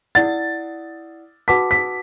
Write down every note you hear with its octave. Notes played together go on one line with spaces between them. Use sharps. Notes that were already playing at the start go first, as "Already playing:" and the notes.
E4 D5 F#5 A6
F#4 B4 F#5 A5 D6 B6
B6